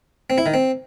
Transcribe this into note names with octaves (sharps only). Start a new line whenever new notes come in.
C4
E4
D#3
C4